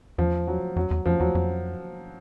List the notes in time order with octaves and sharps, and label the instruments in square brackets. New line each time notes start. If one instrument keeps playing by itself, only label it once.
[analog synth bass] E2 [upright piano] F3
[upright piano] F#3
[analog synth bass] F2 [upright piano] F#3
[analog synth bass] E2
[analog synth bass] F2 [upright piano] F3
[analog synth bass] E2 [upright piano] F#3
[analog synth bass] F2